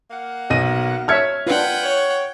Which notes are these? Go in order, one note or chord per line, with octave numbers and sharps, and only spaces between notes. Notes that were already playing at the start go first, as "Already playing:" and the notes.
A#3 F5 F#5
B1 D#5 A#6 D#7
C#5 E5 A5 F6 G#6 C#7
D4 F4 B4 F#5 G5
C#5